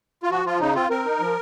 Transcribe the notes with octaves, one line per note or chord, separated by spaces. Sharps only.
F4
F3 F#4
F3 F4
C#3 D#4
C4 F4
C4 A#4
D#4
F3